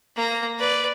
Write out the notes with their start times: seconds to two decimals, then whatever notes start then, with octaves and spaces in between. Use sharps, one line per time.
0.16 A#3 A#5
0.59 B4 D5